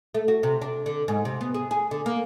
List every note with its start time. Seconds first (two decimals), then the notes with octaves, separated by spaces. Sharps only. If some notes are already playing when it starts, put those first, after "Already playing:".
0.15 A3
0.28 F#4
0.43 C3
0.62 D4
0.86 D3
1.08 G#2
1.25 C3
1.41 B3
1.54 G#4
1.71 G#4
1.91 D3
2.06 A#3